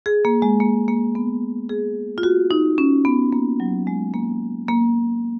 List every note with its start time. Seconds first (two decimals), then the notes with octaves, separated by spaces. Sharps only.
0.06 G#4
0.25 A#3
0.42 G#3
0.60 A#3
0.88 A#3
1.15 B3
1.69 G#4
2.18 F4
2.23 F#4
2.51 D#4
2.78 C#4
3.05 B3
3.33 A#3
3.60 F#3
3.87 G#3
4.14 A#3
4.68 A#3